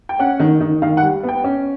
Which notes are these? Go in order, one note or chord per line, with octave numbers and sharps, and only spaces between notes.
G5
C#4 F#5
D#3
D#3
D#3 F5
F#5
G3
B3
G5
C#4